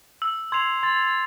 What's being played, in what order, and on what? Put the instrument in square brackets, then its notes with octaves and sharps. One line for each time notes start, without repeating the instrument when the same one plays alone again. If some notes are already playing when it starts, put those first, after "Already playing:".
[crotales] E6
[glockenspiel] C6 [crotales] G#6 C7 F7
[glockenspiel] C6 [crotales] A6